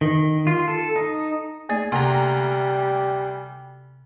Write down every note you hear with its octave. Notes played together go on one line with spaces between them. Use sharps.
D#3
F4
A4
D#4
A3 A#3 G#4 D5
D2 C3 G3 F#5 A#5